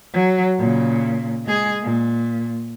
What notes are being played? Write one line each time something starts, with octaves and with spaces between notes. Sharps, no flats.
F#3
A#2 C#3
G#3 G#4
A#2